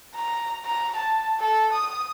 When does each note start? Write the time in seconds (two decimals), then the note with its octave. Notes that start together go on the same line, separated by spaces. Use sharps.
0.15 A#5
0.65 A#5
0.96 A5
1.40 A4
1.73 D#6